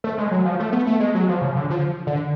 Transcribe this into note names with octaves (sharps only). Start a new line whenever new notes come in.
A3
G#3
F#3
F3
A3
B3
A3
G#3
F#3
F3
C#3
D3
F3
D3